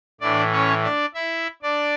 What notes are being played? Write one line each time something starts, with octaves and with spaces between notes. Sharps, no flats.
A2 E3 D4 D5
C#4 C#5
D4 D5
E4 E5
D4 D5